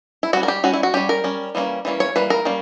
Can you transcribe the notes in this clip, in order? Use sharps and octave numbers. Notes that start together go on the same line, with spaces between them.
E4
G3 C#4 F#4
A#4
G4
G3 C#4 F#4
E4
F#4
G3 C#4 G4
A#4
G3 C#4
E3 G3 A#3 C#4
E3 G3 A#3 C#4
C#5
E3 G3 A#3 B4
A#4
G3 A#3 C#4